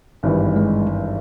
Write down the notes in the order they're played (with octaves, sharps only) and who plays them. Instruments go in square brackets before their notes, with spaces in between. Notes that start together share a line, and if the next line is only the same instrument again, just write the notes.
[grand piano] G#1 G2 E3 G3
[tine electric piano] G#3